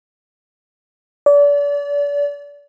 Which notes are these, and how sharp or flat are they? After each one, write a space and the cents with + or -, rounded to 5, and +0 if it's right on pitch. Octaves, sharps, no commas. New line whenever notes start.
D5 -35